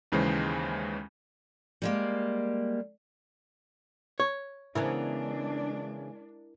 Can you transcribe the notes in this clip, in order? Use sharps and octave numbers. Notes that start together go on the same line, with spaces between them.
D#2 C#3 E3 G#3 C5
G3 G#3 A#3
C#5
C#3 E3 G#3 B3 D4 E4 A#4